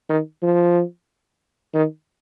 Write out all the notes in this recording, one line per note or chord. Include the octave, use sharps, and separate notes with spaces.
D#3
F3
D#3